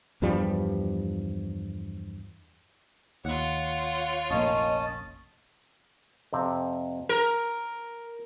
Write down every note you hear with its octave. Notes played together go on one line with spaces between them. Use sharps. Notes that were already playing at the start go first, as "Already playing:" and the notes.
E2 G2 F3 G3
D#2 F4 C#5 F#5
F1 A#1 A#3 C#4 D#5 A5 D#6
F2 C3 C4
A#4 A5